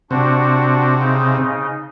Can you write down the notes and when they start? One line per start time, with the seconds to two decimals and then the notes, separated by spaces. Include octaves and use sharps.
0.11 C3 D4 F#4
0.98 C#3 D#4